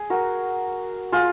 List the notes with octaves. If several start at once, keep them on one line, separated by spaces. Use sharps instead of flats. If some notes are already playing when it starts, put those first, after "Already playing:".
Already playing: G#4
F#4 A#4
F4 G#4